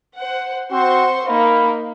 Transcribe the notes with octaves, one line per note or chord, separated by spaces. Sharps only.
C5 F#5
C4 F#4 C5 C6 C#6
A#3 D#4 F5 B5